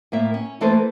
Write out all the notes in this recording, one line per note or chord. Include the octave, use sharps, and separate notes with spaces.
A2 A#3 E5
C#4
E3 A3 A#3 A4 B4 C5